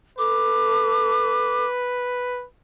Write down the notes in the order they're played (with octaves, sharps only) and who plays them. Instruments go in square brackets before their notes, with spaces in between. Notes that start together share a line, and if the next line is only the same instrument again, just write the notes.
[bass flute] A4 [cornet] B4 [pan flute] D6